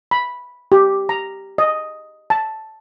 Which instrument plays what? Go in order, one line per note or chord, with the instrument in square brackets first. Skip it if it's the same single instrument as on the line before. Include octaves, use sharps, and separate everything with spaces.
[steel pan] B5
G4
A#5
D#5
A5